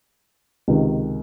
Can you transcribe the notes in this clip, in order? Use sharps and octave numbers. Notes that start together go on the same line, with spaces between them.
C#2 C3 D#3